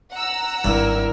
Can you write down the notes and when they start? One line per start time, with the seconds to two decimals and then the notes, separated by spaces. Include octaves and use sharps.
0.12 F#5 A#5 E6
0.65 G#1 G2 E4 A#4